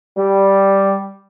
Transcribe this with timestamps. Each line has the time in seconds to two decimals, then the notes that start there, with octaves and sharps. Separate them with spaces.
0.17 G3